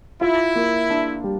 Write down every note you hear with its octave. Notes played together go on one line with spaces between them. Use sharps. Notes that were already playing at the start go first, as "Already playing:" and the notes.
E4 F4
A#3
D4
G3